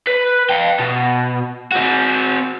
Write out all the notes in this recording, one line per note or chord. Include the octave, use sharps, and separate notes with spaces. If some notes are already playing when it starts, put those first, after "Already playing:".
B4
F5 G5
B2
C4 F#4